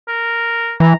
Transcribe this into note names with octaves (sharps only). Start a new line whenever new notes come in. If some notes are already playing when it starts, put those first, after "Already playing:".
A#4
E3 A#5